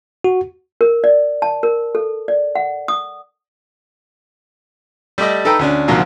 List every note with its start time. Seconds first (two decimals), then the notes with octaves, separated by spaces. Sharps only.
0.24 F#4
0.81 A#4
1.04 D5
1.42 A5
1.63 A#4
1.95 A4
2.28 D5
2.55 F#5
2.88 D#6
5.18 G3 A3 D5 D#5
5.45 D#4 A4 B4 G5 A#5
5.59 D2 C#4 D4
5.88 D2 G#2 C3 F3 F#3 A#3